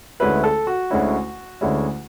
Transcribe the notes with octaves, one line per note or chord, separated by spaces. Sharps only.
D2 D3 G#3 C#4 E4 B4
A4
F#4
D2 D3 G#3 C#4 E4
D2 D3 G#3 C#4 E4